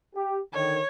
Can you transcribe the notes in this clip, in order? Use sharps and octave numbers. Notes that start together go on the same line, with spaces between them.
G4
D3 D#3 C#5